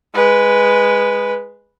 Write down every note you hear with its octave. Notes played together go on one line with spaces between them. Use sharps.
G#3 B4